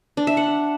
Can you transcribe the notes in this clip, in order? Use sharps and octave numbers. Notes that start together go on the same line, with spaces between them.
D4
E5
F#5